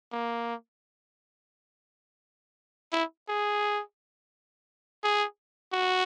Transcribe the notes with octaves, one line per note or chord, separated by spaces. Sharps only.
A#3
E4
G#4
G#4
F#4